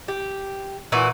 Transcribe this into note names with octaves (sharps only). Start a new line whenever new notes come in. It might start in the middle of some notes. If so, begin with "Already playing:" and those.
G4
A#2 E3 F#4